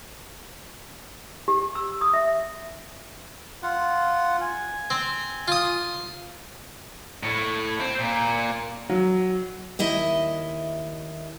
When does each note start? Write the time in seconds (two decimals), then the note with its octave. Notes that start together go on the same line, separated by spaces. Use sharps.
1.48 G4
1.75 E6
2.01 D#6
2.14 E5
3.63 F4 F#5
4.41 G#5
4.90 C4
5.48 F4 D#6
7.23 A2
7.80 C4
7.99 A#2
8.89 F#3
9.79 D#2 E4 D#5 E5